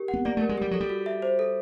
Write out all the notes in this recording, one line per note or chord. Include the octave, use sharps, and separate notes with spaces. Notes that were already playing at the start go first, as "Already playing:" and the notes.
Already playing: G4 A#4
F#5
B3
A#3 D5
A3 A#4
G#3
G3 G4
F#3 A4
G3
F#4
E5
C5
A4